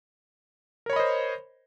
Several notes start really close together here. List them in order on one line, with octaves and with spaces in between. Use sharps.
A#4 C#5 B5 D#5 C5